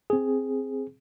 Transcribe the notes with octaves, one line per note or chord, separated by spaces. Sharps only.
C4 G#4